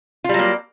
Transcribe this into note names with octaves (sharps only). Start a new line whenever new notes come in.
F#3 G3 A#3 F4